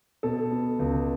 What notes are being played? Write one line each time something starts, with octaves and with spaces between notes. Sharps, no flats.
B2 A4
B3
C#2